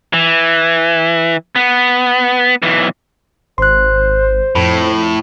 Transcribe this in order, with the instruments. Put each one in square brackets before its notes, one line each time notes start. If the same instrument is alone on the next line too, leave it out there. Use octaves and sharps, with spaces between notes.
[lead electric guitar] E3
B3
B1 E3
[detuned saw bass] G#1 [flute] C5 [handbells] C6 F#6
[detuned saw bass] F2 [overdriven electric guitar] A2 [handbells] B5